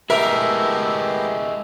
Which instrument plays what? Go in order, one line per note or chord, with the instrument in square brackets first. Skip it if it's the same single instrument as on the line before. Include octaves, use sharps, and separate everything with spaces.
[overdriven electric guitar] G#3 E4 [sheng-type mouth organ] A3 B3 G4 [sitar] A#4 [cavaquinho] E5